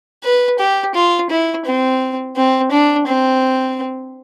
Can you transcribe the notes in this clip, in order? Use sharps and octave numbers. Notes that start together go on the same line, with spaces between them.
B4
G4
F4
E4
C4
C4
D4
C4